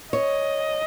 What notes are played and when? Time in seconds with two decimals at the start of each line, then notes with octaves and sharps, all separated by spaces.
0.13 C#5 D#5